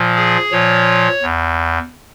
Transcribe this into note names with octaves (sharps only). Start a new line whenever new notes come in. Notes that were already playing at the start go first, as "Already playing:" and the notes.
Already playing: A#2 F3
G#4
A#2 F3 C#5
E2